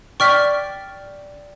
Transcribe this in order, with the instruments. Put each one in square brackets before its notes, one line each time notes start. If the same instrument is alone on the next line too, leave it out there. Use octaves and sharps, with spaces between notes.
[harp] D5 G5 [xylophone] C#6 F6 B6